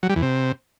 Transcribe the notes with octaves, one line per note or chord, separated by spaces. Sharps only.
F#3
G3
E2
C3